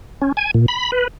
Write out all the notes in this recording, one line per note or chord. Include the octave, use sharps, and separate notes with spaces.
C#4
G#5
A#2
B5
B4